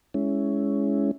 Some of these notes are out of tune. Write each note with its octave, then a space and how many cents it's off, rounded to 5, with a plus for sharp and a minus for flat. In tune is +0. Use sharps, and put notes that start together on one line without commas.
G#3 +0 C#4 +10 E4 +0